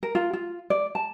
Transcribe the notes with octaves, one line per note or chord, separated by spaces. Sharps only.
A#4
F4
F4
D5
A5